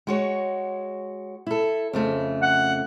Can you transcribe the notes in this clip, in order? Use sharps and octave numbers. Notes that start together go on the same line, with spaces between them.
G#3 F#4 C#5
E4 A4
F2 C#3 A3
F#5